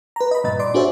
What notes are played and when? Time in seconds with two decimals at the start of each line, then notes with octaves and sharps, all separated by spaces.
0.16 B4 A#5
0.31 D#5 B5
0.44 G2 A#2 D#5 A6
0.59 D5 C6 D6
0.74 D4 F#4 G#4 C5 C#5 E5